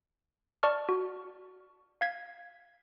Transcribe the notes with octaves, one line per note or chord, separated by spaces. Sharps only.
D5 A5 C#6 F6
F#4
F5 G#6 B6